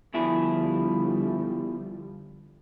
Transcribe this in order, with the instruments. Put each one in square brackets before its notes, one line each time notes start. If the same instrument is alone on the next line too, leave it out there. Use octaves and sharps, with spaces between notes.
[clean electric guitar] B2 E4 G#4 [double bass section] D3 F3 G3